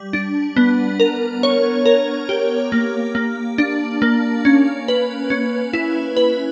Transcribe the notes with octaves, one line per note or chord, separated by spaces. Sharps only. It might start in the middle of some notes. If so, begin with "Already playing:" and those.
Already playing: G3
D4
B3
A#4
C#5
A#4
G4
A#3
A#3
D4
A#3
C#4
B4
C#4
E4
B4